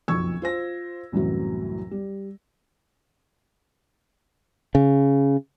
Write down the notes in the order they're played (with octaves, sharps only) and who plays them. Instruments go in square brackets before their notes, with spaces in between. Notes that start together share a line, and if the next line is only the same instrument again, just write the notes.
[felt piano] F#1 B1 F2 C#6 E6 G#6
F4 C5 A#6
C2 F#2 A2 E3 F#3
G3
[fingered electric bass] C#3